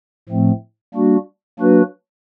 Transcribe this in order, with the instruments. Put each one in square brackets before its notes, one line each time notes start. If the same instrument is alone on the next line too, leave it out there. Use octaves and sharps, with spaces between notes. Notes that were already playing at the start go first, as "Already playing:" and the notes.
[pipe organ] A2 F3 A3 C4
G3 A#3 D4 F#4
F#3 A#3 D4 F#4 B4